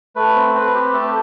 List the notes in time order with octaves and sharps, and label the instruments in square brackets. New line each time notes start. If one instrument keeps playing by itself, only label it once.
[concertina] A3 B4
C4
C4 B4
G4
A3 A4